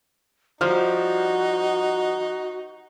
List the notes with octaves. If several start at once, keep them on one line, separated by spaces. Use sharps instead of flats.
F3 G3 D#4 F#4 C5 F6